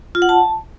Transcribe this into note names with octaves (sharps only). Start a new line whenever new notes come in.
F4
F#5
A5